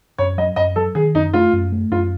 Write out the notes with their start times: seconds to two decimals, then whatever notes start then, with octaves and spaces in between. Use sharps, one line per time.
0.18 F#2 C#5
0.38 F#3 D#5
0.56 F#2 D#5
0.76 F#3 A4
0.95 D#3 G#4
1.15 F#2 D#4
1.33 A3 F4
1.53 F#2
1.72 A3
1.91 F#2 F4